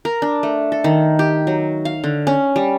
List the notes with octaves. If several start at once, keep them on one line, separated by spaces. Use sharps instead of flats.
A#4
D4
A3
A4
D#3
G4
F#3
F5
D3
C#4
G3